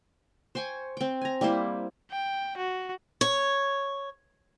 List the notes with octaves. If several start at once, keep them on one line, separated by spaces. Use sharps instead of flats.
C5 G5 G#5 C#6
C4 G5
G#5 A#5
G3 A#3 E4 C5
G5
F#4
C#5